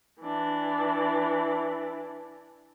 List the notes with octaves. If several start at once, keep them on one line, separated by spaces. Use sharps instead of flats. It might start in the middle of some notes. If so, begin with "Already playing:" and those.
E3 D4